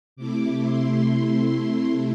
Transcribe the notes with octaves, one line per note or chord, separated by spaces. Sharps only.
C3 A3 E4 D6
C6